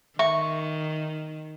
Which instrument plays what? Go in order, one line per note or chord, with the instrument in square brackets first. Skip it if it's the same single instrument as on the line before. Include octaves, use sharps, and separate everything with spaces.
[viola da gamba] D#3 [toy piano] E5 [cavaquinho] C#6